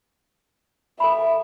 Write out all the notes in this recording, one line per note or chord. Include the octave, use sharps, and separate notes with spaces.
A4 E5 G#5 B5